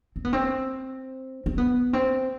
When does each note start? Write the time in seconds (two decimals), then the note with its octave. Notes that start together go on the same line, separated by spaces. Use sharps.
0.16 C4
0.25 B3
0.33 C4
1.46 C4
1.58 B3
1.93 C4